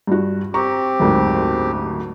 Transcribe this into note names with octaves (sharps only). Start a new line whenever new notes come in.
G2 F#4
C4 G4 A#5 C#6
F#1 D2 G#2